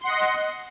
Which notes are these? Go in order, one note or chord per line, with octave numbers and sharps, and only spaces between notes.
D#5 F#5 C6